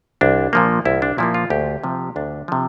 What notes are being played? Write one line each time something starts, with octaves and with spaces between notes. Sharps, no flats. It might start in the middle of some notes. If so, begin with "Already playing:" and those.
C2 D4
A#2 F3 A#3
C2 E4
D4
A#2 F3 A#3 E4
F4
D2 G4
C3 F3
D2 D4
C3 F3